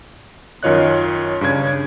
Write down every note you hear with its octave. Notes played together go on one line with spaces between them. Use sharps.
F#2 D#3 F4 C#5 D#5 F#6
G2 C#3 C#4 G#6